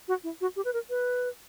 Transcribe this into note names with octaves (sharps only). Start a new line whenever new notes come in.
F#4
E4
F#4
G4
B4
A#4
B4